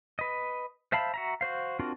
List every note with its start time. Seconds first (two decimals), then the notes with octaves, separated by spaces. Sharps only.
0.19 B4 D#5
0.92 C5 E5 F5 A5 B5
1.14 F#4 E5 A#5
1.41 F#4 C5 F5
1.79 C4 D4 F4 F#4 A#4